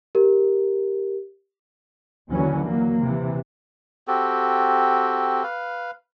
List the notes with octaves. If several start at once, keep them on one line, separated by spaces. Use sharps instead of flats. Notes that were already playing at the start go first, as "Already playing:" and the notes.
G4 A#4
D#2 D3 E3 F#3 C#4
F#3 A#3
C3 E3
C4 F#4 G4 A4
B4 F5